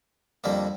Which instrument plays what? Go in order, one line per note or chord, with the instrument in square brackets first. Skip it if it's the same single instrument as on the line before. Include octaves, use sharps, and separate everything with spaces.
[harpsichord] F2 D3 G3 A#3